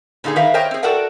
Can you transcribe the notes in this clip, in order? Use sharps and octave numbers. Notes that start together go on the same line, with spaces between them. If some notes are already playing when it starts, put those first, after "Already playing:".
A#2 D3 D#4 F#4 G#4
D#3 A#4 B4 E5 F5
A#4 C5 C#5 D#5 G5
C4 G#4
F#4 A4 A#4 D5 F#5 G5